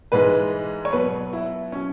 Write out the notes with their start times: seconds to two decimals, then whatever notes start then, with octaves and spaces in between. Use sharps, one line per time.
0.12 G#2 E3 G#3 B4
0.85 C#5
0.93 B2 F#3 B4
1.33 E4
1.72 F#3 C#4